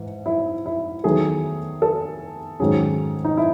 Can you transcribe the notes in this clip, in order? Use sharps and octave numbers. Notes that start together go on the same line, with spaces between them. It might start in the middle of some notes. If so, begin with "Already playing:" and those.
Already playing: G#2 E3
E4
E4
E2 D#3 F#3 A3 G#4
A4
G#2 D#3 F#3 C#4 G#4
D#4
E4